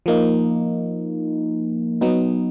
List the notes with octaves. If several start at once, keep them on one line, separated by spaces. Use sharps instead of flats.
F3 A#3 D#4
F#3 B3 D#4